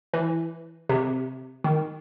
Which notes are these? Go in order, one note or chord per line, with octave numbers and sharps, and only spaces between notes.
E3
C3
D#3